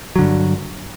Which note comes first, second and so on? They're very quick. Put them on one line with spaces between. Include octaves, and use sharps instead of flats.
F#3 D3 G2